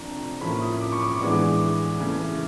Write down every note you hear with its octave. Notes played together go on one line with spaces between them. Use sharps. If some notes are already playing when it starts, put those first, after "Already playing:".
Already playing: C3 F3 A3 D4 A#5
A2 F3 A#3 C#4 B5
D#6
D6
C#6
D6
A2 E3 G#3 B3 D4 D6
C#3 E3 A3